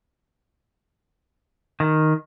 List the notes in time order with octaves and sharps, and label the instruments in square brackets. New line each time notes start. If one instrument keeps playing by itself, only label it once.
[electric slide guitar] D#3